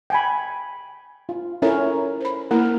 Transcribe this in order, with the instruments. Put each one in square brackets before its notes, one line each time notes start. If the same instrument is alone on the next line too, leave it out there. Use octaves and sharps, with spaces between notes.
[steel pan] G5 G#5 B5
F4
[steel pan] C#4 E4 A#4 [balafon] A4 C#5 E5
[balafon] C5 B5
[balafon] A#3 E4 [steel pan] A#4